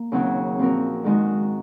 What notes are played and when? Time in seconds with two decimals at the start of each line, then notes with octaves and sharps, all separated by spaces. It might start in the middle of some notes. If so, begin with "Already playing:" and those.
Already playing: A#3
0.12 D#2 C#3 F#3 C4 F#4
0.59 A#2 F3 C4 F#4 A#4
1.04 G#2 D#3 G#3 D#4 F#4